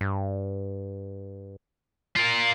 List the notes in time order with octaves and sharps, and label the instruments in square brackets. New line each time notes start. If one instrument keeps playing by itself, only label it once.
[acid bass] G2
[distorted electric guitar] F4 A#4